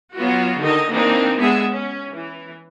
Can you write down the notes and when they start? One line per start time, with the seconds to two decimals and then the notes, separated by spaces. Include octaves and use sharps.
0.16 F#3 B3 F4 F#4
0.59 D3 D#3 D#4 D#5
0.91 E3 A#3 C4 D4 D#4
1.38 G#3 B3 D4 G#4 E5
1.69 C#4
2.11 E3